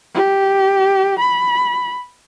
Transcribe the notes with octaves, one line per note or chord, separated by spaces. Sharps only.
G4
B5